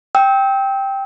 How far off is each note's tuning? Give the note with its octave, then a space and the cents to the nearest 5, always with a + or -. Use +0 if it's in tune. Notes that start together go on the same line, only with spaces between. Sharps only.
G5 +0 E6 -35